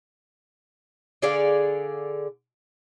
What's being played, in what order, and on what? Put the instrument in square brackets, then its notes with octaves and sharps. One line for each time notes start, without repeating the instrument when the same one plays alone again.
[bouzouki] D3 G#4 D5 F5